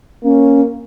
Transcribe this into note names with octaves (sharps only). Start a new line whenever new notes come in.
A#3 C#4